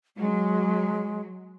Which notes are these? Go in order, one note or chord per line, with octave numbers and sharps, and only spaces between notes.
F#3 G#3